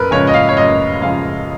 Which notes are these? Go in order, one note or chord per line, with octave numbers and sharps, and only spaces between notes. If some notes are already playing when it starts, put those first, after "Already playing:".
Already playing: F#2 A#4 B4
C#3 F3 G#3 C#5
D#5
F5
C#5
F#2 D#5
C#3 F3 G#3 F5